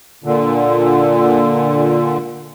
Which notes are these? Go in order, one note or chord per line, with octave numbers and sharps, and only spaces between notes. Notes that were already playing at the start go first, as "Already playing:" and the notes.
A#2 D3